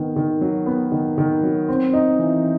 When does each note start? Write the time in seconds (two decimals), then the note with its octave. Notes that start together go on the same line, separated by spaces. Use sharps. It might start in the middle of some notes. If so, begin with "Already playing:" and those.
Already playing: D#3 B3
0.16 D#3
0.41 F#3
0.66 B3
0.92 D#3
1.18 D#3
1.43 F#3
1.68 C4
1.93 D#4
2.19 E3